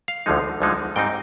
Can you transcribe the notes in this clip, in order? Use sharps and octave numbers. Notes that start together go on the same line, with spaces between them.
F5
D2 D3 F3 G#3 D#4
D2 D3 F3 G#3 D#4
G#2 G3 C4 D#4 G5